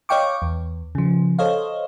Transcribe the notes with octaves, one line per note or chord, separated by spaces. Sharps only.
C#5 D#5 F5 G5 C#6 D6
E2
C#3 F3
A4 C5 C#5 D#5 F5